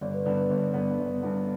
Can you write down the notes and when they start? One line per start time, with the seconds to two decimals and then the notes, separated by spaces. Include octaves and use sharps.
0.01 G1 D5
0.14 B4
0.26 G2 D3 B3 D5
0.38 B4
0.50 G1 D5
0.74 G2 D3 B3
0.99 G1
1.23 G2 D3 B3